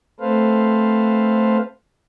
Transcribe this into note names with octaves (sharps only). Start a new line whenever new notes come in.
A3 C4 A4 B4 C5 F5